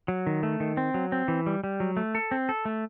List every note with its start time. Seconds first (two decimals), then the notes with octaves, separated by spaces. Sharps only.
0.08 F#3
0.27 D#3
0.43 A3
0.60 D#3
0.77 C4
0.94 F#3
1.12 C4
1.28 E3
1.46 G3
1.64 G3
1.80 F#3
1.97 A3
2.15 A4
2.31 C4
2.49 A4
2.65 A3